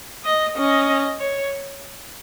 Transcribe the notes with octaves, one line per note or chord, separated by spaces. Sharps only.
D#5
C#4 D#5
C#5